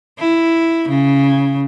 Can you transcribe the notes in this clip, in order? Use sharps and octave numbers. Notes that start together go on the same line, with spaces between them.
E4
C#3